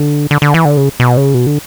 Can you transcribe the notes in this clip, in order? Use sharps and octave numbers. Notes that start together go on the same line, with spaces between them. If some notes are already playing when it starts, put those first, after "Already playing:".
Already playing: D3
D3
D3
E3
D3
C#3
B2
C#3
B2
D3